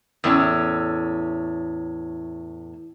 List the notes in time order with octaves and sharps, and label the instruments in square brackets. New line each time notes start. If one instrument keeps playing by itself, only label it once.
[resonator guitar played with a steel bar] E2 A2 C#4